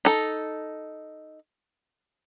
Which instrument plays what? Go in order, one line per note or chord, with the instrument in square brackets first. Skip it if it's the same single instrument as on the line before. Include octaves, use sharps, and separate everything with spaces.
[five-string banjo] D#4 A4